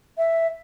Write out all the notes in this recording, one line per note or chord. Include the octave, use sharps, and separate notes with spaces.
E5